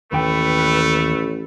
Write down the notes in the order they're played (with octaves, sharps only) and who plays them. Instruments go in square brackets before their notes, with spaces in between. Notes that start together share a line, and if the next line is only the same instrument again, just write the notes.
[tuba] A1 [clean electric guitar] D#2 G5 [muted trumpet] A3 [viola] B4